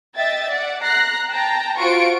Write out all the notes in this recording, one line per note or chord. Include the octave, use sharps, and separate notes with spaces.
D#5 E5 G5 A6
D5 F#5
A#5 F#6 A#6 C7
G5 A5 A#5
F4 F#4 C5 C#6 D7